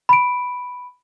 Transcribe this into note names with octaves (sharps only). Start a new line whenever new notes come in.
B5 D7